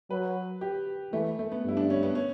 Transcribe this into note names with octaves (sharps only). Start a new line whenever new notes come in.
F#3 B4
G4
E3 A3
A3
B3
G2 E4
D4
C#4
B3
C#4